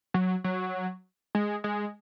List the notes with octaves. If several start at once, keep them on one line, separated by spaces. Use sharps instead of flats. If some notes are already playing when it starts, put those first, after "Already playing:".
F#3
F#3
G#3
G#3